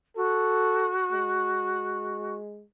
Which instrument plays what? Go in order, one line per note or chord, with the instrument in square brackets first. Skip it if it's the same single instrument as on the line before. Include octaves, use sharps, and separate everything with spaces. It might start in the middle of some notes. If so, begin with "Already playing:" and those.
[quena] F#4 [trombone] A4
[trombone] G#3